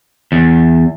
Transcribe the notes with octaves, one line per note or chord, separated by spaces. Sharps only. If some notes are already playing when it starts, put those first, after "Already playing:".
E2